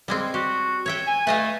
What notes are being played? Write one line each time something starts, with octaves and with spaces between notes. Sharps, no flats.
G3 G#3 C4
F#4 G4
C#5 E5 G5
G#5
A3 B4 D#5 F5